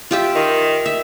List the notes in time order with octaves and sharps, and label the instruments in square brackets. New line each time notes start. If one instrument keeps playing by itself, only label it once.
[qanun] F4 G4 E5
[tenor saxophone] D#3
[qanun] E5